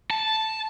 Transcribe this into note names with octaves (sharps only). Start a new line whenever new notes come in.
A5